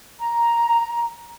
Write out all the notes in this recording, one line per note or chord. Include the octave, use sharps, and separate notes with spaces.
A#5